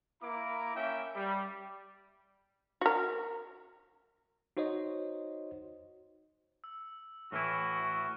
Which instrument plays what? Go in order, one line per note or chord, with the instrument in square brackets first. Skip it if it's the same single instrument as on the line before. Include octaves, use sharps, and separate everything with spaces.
[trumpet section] A#3 E4 A#5 D6
A#3 C#4 E5 G5
G3
[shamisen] F#4 A#4
[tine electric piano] D#4 F#4 C5 C#5 D#5
[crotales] E6
[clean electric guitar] A2 E3 E4 [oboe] F#4 [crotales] C#6 F6 D#7